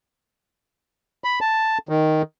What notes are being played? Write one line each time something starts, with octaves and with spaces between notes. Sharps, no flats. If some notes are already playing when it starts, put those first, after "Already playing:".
B5
A5
D#3